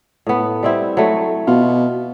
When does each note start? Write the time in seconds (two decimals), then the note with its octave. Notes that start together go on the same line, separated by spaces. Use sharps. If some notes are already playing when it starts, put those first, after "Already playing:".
0.27 A2 B3
0.63 G3 C4 E4
0.97 F#3 A3
1.47 B2 F4